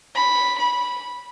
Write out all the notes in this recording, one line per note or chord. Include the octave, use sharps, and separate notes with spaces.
B5
B5